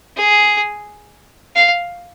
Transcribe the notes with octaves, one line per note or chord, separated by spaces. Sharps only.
G#4
F5